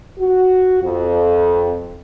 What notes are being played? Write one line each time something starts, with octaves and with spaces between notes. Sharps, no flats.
F#4
F2